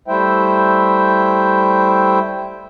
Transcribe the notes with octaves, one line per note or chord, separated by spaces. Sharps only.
G3 A3 E4 C5 E5 G5